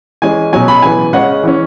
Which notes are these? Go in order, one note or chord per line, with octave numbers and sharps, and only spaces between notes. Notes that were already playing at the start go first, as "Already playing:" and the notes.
E3 G#3 C#4 G#5
B2 F#3 C#4 G#5
B5
C#3 E3 B3 G#5
C#3 G#3 C#4 F#5
E3 C#4